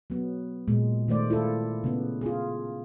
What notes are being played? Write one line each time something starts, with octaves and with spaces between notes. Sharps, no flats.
F#3 B3
A#2 G#3
D#3 A3 C5 D5
E4 F4 A4
C#3 B3
F4 G#4